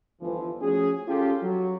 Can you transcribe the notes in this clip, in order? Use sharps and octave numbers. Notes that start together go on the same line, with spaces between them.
G1 E3 F3
F3 A3 C#4 F#4 G#4
C#4 F4 G4 A4
F#3